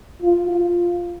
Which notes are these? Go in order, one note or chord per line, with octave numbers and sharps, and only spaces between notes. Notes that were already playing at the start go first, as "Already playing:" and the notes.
F4
F4